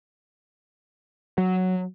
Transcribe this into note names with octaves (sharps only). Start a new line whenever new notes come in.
F#3